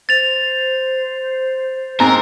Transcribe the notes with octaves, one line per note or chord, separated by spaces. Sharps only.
C5 A6 F7
G#2 C4 A#4